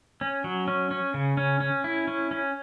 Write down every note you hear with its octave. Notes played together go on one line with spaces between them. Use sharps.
C#4
F#3
C#4
C#4
C#3
C#4
C#4
E4
C#4
C#4